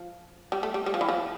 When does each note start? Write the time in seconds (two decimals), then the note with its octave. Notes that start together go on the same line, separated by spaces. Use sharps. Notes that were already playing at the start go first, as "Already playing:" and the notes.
Already playing: F3
0.52 G3
0.63 A3
0.74 G3
0.86 G3
0.94 F3
1.01 E3
1.09 F3